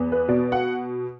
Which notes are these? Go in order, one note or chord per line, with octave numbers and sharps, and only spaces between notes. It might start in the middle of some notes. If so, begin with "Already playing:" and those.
Already playing: E2 B3
B4
B2 D5
F#5